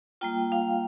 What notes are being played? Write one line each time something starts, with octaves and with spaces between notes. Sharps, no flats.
G3 A#3 F4 G5
F5